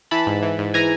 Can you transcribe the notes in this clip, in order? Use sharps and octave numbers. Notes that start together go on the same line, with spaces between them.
E3 A5 B5
G#2
E3
G#2
E3 G#5 A#5